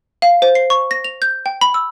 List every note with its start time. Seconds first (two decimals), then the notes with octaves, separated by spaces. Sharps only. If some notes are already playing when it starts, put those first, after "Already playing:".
0.22 F5
0.42 C5
0.55 C7
0.70 C#6
0.91 A#6
1.04 F7
1.22 G6
1.46 G5
1.61 B5
1.74 E6